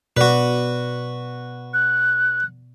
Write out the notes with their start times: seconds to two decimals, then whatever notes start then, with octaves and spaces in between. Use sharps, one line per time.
0.17 B2 F#4 B4 D5
1.74 F#6